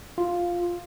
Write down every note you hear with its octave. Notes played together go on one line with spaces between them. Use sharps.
F4